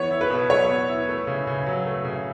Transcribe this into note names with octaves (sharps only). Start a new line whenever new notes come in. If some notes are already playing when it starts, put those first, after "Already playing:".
Already playing: E3 B3 C#5
E4
B4
B2
F#3 C#5
B3
E4
A3
C#3
C#3
F#3
A3
C#3